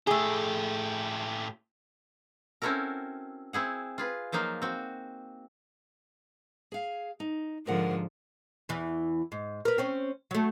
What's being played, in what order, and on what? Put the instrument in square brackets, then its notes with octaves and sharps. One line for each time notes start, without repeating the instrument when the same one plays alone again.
[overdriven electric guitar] A2 G4 [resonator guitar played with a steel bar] A3 G#4
[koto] C4 C#4 E4 F#4 A4 A#4
C4 E4 G#4 F#5
F4 G#4 B4
F3 F#3 A#3 D#4 F4
C4 F#4
[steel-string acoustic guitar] G#4 F5
D#4
[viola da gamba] G#2 D3 F3 [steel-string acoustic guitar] A#4 F#5
[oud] E2 E3
G#2
A#4 B4
C4 C#4
F#3 A3